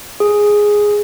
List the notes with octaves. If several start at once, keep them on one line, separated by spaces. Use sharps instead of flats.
G#4